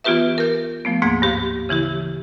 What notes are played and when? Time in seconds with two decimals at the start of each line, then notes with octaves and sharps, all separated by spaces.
0.04 E3 B3 F4 G4 B4 E5
0.38 A#4 G6
0.85 F3 A3 B3
1.02 D2 G#2 A#3 G#6
1.22 G2 G4 F5
1.69 C#3 E3 E4 G4